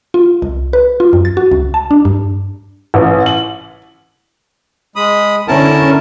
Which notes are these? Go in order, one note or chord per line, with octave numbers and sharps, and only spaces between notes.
F4
C2
B4
F4
F#2
A6
F#4
C#2
A5
D4
G2
A1
F#7
G#3 B5 D#6
D3 C#4 E4 A#4 A5